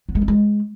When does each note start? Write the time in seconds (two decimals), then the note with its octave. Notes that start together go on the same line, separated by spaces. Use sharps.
0.09 B3
0.15 G#3
0.22 C4
0.28 G#3